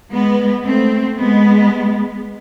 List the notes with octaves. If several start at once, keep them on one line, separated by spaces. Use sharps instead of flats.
G#3 B3
A3 C4
G#3 B3